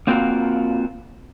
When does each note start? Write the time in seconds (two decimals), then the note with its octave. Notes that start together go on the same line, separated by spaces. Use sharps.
0.07 A#3 C4 F4 F#4 A#4 F5